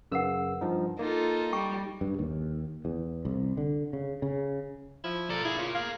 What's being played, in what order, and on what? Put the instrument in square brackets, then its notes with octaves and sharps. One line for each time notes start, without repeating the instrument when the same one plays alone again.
[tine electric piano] F#2 C#3 E6 [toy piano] A#4 B4 F#5
[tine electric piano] G2 F3 D#4
[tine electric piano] A#3 [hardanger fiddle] D#4 [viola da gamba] F4 A4
[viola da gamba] G3 [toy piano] G5 C#6
[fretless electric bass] G2
D#2
E2
C2
D3
C#3
C#3
[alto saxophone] F3 [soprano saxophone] E4
[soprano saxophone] A4 [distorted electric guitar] A#4 D5
[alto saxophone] E4 [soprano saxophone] G#4
[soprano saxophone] C#4 [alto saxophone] F4
[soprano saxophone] G#4 [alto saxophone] F5